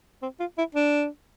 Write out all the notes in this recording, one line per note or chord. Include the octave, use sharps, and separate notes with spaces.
C4
F4
E4
D4